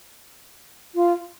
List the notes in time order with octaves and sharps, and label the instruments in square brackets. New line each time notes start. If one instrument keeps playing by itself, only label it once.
[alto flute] F4